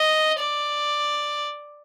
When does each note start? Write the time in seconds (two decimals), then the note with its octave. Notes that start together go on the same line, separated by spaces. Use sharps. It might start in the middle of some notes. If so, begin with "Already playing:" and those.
Already playing: D#5
0.39 D5